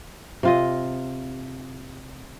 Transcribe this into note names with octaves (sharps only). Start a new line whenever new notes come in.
C3 F4 D#5